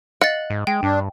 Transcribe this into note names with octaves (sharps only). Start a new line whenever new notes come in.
D#5 F5 F#5 A6
G#2
G#3 G5
G2 D4